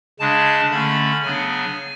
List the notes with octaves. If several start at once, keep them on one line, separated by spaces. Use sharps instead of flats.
C#3 G#3 D4 A5
D3 A3 C#4 B5
C#3 F#3 B3 D4 G#5